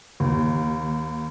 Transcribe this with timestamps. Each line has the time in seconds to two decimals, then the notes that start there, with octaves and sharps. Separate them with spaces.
0.20 D#2